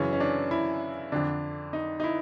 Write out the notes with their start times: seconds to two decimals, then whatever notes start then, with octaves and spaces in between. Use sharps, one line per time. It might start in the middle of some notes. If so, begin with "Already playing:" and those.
Already playing: F#2 C#3 E3 C#4
0.13 C#4
0.20 D4
0.51 E4
1.12 F2 D3 D4
1.73 D#4
2.00 D#4
2.04 E4